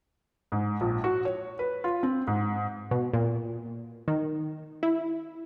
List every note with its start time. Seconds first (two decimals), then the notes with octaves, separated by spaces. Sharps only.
0.52 G#2
0.81 A#1
1.04 F#4
1.25 C#5
1.59 B4
1.84 F4
2.03 C4
2.27 G#2
2.91 B2
3.13 A#2
4.08 D#3
4.83 E4